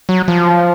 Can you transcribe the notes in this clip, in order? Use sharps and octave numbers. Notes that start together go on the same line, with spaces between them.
F#3
F3